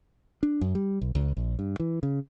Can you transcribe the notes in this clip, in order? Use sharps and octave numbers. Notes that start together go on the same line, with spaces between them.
D4
F#2
G3
B1
C#2
A#1
G2
E3
C#3